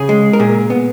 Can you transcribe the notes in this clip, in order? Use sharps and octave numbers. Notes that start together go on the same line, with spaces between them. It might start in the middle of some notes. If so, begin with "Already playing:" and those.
Already playing: C#3 G#4
G#3
A#4
A#2 G#4
B3